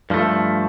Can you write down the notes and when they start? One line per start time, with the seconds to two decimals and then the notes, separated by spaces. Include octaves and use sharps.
0.10 G2 F3 A3